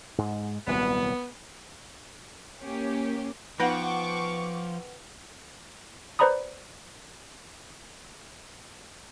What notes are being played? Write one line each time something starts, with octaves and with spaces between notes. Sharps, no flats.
G#2 G#3
D#1 C2 F#3 B3
A#3 C#4 G4
F3 B3 D#4 B4 F#5 G5 C#6 D6
B4 C5 D5 A#5 B5 D#6